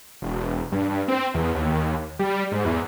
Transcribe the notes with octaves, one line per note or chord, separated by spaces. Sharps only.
E1
G2
G2
C4
E2
D#2
G3
G#2
E2